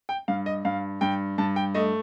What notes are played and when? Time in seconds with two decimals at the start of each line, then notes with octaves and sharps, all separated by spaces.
0.09 G5
0.28 G2 F5
0.46 D#5
0.65 G2 F5
1.01 G2 G5
1.38 G2 A5
1.56 G5
1.75 A3 D#5